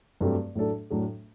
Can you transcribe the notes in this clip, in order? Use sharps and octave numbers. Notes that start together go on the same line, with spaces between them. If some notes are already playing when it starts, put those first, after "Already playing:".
G2 F#3 A3 C4 G4
A2 F#3 A3 D4 A4
A2 F#3 A3 D4 A4